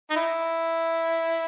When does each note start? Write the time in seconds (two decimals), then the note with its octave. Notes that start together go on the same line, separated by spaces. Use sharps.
0.10 D#4
0.16 E4